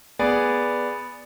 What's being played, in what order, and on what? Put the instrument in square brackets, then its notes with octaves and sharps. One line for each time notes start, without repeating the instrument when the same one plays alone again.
[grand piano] B3 G#4 D5